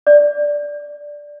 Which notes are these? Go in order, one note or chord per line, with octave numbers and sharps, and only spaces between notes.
D5